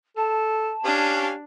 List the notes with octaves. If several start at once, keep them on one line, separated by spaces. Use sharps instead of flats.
A4 A5
C#4 D4 G4 F5 G#5